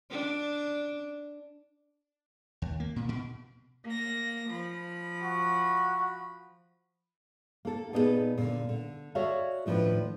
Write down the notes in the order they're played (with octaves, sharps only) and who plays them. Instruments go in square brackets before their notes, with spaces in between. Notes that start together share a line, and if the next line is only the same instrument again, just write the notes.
[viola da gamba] D4
[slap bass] D#2
A#3
A#2
B2
[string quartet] A#3 A#6
F3 B5
[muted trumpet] F#4
[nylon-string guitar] A#3 A4
A#2 B3 D#4 E4 G#4 A4
A#2 D3
D3
F#4 A4 C#5 D5 E5 F5
D#2 A2 F3 D4 B4